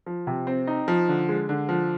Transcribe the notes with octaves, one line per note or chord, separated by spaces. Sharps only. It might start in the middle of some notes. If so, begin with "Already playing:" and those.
F3
C3
C4
D#4
F3
D3
G#3
D3
F3